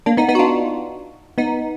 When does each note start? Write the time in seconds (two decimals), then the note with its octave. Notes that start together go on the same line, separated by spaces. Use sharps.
0.06 A#3 D4
0.17 B3 D#4
0.29 B3 D#4
0.35 F#4
0.39 D4 F4
1.38 B3 D#4